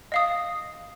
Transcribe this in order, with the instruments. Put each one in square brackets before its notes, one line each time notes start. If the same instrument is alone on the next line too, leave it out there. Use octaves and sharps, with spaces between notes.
[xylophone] D#5 F5 D#6